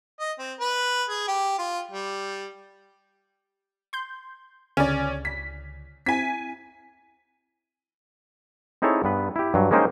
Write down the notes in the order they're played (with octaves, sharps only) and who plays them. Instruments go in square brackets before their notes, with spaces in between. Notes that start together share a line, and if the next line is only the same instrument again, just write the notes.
[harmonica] D#5
C4
B4
G#4
G4
F4
G3
[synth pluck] C6 G6
[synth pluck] C#2 D3 [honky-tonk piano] C#4 D5
[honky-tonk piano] B6
[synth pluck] C4 E4 [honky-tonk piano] G#5 B6
[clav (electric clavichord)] C4 D#4 E4 G#4 A4 C#5
G2 B3 B4
E4 G4
G2 F#3
G#3 A#3 C#4 D#4 C5 G5